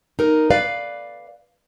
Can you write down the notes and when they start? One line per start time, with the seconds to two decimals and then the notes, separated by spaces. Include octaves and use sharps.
0.19 D#4 A#4
0.50 B4 D5 F5